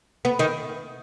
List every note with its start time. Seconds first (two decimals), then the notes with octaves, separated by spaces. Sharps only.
0.25 B3
0.39 D#3